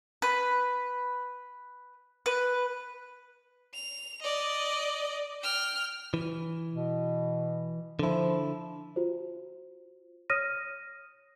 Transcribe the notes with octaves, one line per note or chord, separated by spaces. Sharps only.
B4
B4
F7
D5 D#5
G5 F6
E3
B2
D3 F3 E4
F4 F#4 C5
C#5 D#6 F6 A#6 D#7